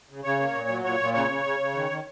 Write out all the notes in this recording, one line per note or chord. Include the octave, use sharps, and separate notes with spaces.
C#3
C#3 C#5
A#3
A#2
F#3
A#2 C#5
A#2
C#3 C#5
C#3
C#3
C#3
D#3
D#3